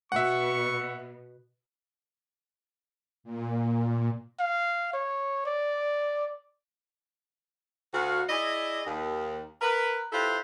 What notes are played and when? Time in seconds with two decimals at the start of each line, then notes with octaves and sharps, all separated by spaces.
0.12 B2 E5 F#5 C#6
3.23 A#2
4.40 F5
4.94 C#5
5.46 D5
7.94 D2 F#4 F5
8.29 E4 G#4 D5 D#5
8.87 D#2
9.61 A#4 B4
10.13 E4 F4 G4 A4 B4 C5